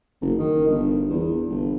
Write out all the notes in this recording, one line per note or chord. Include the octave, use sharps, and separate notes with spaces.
F#1
D#3
G1
E2
G1